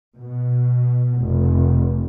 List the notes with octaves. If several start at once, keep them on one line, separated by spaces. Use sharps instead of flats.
B2
F1